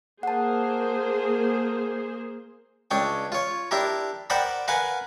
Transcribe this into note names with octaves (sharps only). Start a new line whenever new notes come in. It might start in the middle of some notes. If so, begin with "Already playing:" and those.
A#3 G#4 C5 F#5 A5
C#2 D4 C#5 G5
F4 C#5
D4 E4 G4 A#4
A#4 C5 D5 F#5 G5 B5
A#4 B4 F5 F#5 G#5